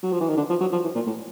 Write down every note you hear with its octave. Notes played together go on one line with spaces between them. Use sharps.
F#3
F3
E3
D#3
D3
F3
F#3
F3
E3
A#2
A2